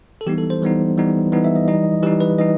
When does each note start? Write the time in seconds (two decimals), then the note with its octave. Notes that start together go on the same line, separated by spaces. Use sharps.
0.21 A4
0.26 E3 G3 B3 D#4 G4
0.38 A4
0.50 C5
0.62 E3 G3 B3 D#4
0.97 E3 G3 B3 D#4
1.32 E3 G3 B3 D#4 D#5
1.44 E5
1.56 D#5
1.68 E3 G3 D#4 D#5
2.03 E3 G3 D#4 G4
2.20 B4
2.39 E3 G3 D#4 D#5